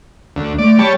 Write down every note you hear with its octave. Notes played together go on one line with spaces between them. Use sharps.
D2
A3 D5
G3 C#5 A5 B5